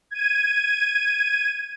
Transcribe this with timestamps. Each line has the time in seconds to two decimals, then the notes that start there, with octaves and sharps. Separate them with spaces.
0.11 G#6 D#7